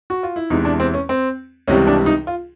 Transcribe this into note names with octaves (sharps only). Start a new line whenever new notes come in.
F#4
F4
E4
E2 C3 E3 G#3 D#4
D4
C4
C#4
C4
C#2 C3 E3 G3 C#4
D4
D#4
F4